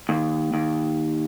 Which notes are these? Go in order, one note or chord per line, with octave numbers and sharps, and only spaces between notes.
D#2
D#2